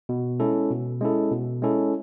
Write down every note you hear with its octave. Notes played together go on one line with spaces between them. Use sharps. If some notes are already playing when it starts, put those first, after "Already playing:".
B2
G#3 C#4 E4 A4
B2
G#3 C#4 E4 A4
B2
G#3 C#4 E4 A4